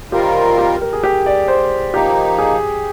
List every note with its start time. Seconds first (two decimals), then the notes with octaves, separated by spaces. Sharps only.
0.12 D#3 G3 C4 F4 G4 A#4
0.58 G4
0.81 A#4
0.93 G#4
1.03 G4
1.26 D5
1.48 C5
1.94 F3 A#3 D#4 G4
2.39 G#4